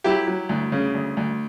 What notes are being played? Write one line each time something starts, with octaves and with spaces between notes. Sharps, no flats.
F#3 E4 G4
F#3
D2
C#3
D2
D2